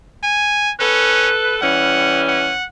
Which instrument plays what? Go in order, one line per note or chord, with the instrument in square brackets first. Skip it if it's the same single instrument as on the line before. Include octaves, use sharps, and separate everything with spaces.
[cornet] G#5
[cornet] C#4 [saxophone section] A4 B4
[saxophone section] E3 G3 C#4 [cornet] F#5
[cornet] F#5